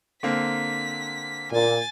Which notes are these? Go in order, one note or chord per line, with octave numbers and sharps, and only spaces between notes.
D3 A#3 C4 B6
A#2 G#5 A6